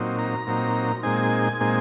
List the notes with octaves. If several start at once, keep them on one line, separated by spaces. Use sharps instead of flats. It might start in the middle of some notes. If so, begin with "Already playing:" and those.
Already playing: A#2 F#3 C4 D#4
A#5
A#2 F#3 C4 D#4
A#2 G#3 C4 D#4 G#5
A#2 G#3 C4 D#4